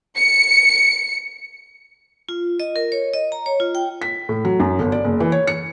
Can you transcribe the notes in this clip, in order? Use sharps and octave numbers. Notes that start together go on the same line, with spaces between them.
C#7
F4
D#5
A#4
C#5
D#5
A#5
C#5
F4
G5
B6
A2
F#3
F#2
G1
D5
F#1
E3
C#5
C#7